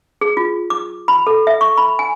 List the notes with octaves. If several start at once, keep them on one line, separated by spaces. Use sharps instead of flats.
G#4
F4
D6
B5
A4
E5
C#6
B5
G#5